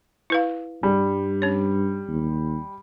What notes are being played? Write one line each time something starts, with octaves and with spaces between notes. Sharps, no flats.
E4 B4 F5
G2 G3
C#4 C#5
D#2